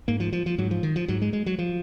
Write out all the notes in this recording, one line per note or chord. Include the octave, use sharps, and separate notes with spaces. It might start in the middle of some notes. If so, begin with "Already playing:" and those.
G#2 A#3
F3
F3
F3
G#2 F#3
F3
D#3
F3
G#2 F#3
G#3
G#3
F#3
F3